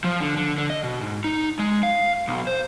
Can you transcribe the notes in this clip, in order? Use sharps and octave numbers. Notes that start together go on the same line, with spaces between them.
F3
D3
D3
D3
D#5
B2
G#2
D#4
G#3
F5
B1
C5